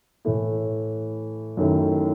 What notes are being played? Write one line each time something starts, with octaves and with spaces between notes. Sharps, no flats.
A2 E3 A3 E4
F#2 D#3 A3 E4